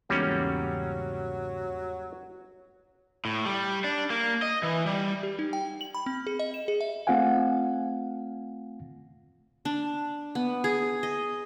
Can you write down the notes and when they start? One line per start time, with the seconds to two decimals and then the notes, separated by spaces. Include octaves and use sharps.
0.10 E2 G#2 C#3 F#3 G3 A#3 C#4
3.25 A2
3.46 G3
3.84 D4
4.10 A#3
4.42 D#5
4.63 E3
4.86 G3
5.23 G4
5.39 D#4
5.53 G5
5.81 F#7
5.94 B5
6.06 C4
6.27 G#4
6.39 D#5
6.54 E7
6.68 G#4
6.81 E5
7.07 A3 C4 F4 F5 F#5 G#5
9.65 D4
10.35 B3
10.64 G#4
11.03 D#5